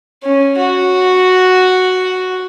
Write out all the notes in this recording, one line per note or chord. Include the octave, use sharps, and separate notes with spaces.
C#4
F#4